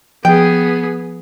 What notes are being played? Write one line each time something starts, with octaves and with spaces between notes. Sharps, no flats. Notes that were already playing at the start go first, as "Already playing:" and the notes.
F3 B3 G#4 G5